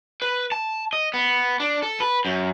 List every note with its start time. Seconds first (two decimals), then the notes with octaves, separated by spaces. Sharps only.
0.22 B4
0.52 A5
0.93 D#5
1.14 B3
1.60 D4
1.82 A4
2.00 B4
2.25 F#2